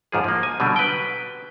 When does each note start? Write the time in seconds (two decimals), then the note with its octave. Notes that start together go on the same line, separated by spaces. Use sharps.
0.12 D#2 G#2 F3 G#4
0.24 F3 A#3
0.43 G#5
0.60 B2 D3 F#3 G3
0.76 B4 G5